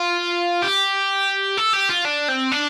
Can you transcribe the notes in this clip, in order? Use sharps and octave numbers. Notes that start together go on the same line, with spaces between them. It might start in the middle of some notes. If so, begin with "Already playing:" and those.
Already playing: F4
G4
A4
G4
F4
D4
C4
D4